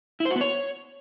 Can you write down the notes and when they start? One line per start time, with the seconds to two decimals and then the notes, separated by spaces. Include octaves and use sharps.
0.20 E4
0.25 C5
0.31 F#4
0.36 B3
0.41 C#5